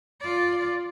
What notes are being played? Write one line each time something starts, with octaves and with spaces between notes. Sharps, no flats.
F4 D5